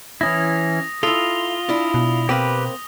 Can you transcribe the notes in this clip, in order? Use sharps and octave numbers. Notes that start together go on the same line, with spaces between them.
E3 C#4 E4 D#6 A#6
E4 F4 A4 D#6 F7 G7
D4 E4
B2
A#3 C4 G4 B4